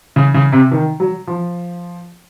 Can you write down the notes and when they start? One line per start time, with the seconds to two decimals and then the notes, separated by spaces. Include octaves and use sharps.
0.16 C#3
0.34 C#3
0.52 C3
0.71 D#3
1.00 F#3
1.27 F3